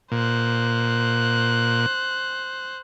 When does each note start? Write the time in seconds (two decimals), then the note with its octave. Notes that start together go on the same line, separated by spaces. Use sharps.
0.11 A#2 C5 F#6